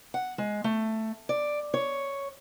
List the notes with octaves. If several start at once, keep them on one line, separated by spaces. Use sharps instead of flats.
F#5
G#3
A3
D5
C#5